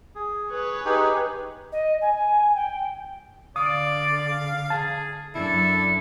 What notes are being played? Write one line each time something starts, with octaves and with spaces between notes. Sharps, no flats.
G#4
G#4 B4 C#5
D#4 G4 G#4
D#5
G#5
G5
D3 D5 F5 D#6
G#4 A5
F#2 D4 E4 A4